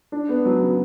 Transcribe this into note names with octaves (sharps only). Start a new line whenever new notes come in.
D4
B3
F#3
C#3